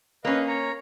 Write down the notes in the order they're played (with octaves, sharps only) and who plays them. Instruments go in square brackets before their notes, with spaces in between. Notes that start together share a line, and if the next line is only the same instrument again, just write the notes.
[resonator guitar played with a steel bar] A#3 C#4 [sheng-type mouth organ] B4 D#5 F5
[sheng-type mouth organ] C#5 A#5